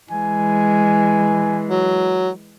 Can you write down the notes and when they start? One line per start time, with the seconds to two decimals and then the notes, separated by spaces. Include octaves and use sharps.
0.11 E3 G#3 G#5
1.70 F#3